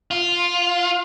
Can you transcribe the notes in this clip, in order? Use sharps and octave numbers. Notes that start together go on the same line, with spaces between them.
F4